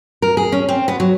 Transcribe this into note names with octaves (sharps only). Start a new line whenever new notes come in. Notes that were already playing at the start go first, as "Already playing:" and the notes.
A#4
G#4
C#4
C4
B3
F#3